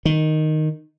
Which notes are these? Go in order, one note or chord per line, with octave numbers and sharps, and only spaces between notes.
D#3